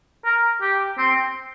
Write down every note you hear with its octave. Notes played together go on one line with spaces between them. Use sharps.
A#4
G4
C4